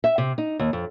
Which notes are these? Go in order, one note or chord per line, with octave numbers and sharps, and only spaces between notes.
E5
C3
D#4
D#2
F2